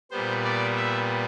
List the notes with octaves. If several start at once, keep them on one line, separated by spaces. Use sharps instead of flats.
A#2 G3 B3 C5
D5
E5